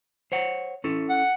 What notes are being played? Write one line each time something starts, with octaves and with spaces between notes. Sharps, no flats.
C5 C#5 F#5
C#4 E4 A4
F#5